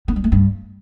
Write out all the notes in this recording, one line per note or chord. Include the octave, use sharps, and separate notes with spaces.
B3
G3
A3
G2